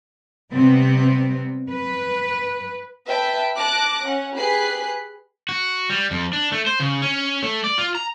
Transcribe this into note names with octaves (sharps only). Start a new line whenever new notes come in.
C3 G3 B3 C4
B4
B4 E5 G5 A5
A5 D6 F#6 A#6
C#4 F#5
G4 G#4 B4 B5 F#6 C7
F#4
G3
F2
D4
A3
C5
C#3
C#4
A3
D5
F4
A#5